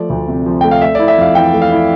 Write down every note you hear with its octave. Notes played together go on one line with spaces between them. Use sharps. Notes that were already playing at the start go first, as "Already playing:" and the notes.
Already playing: F3 A3 D5
D2
C3
F3
A3 G5
F5
A3 E5
E4 D5
E5
F2 F5
E3 G5
A3
F5
E4